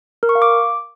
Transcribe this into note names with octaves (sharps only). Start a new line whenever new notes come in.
A#4
C#6
F5
D6